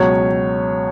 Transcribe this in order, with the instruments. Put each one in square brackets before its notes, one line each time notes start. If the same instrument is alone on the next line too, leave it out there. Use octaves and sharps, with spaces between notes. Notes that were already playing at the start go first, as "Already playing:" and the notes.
Already playing: [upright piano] C#2 B2 F#3 C#5